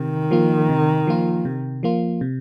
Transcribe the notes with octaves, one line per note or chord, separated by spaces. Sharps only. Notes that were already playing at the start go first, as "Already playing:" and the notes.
Already playing: C3 D#3
F3 A#3 F4
C3
F3 A#3 F4
C3
F3 A#3 F4
C3